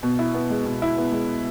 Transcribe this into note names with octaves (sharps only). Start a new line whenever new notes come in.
B2
E4
B3
G#3
B2
E4
B3
G#3